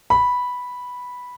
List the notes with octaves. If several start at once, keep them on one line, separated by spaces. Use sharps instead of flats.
B5